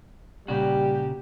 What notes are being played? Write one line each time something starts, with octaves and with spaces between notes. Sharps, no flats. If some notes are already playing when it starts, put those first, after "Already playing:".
A#2 C#3 G3 F#4 G4